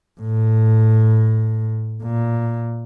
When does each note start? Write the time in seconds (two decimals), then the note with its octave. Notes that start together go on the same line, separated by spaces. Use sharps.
0.21 A2
2.03 A#2